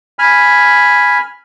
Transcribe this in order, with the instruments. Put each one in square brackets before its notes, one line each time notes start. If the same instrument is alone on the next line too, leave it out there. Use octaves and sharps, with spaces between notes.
[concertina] G#5 B5 F6